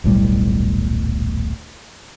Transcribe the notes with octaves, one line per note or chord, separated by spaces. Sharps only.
D#1 B1 A2 G3